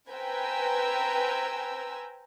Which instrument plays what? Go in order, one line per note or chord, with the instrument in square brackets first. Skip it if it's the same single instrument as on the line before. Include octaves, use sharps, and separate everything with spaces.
[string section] B4 C5 G5 G#5 A#5 E6